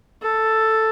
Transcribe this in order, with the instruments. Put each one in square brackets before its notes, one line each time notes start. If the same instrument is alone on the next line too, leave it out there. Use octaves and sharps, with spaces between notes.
[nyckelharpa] A4